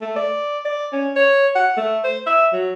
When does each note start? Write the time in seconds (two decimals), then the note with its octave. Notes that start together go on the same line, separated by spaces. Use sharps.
0.01 A3
0.16 D5
0.65 D5
0.92 C#4
1.16 C#5
1.55 F#5
1.77 A3
2.04 C5
2.26 E5
2.53 F#3